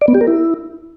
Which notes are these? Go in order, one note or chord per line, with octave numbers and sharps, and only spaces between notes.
D5
B3
G4
A#4
E4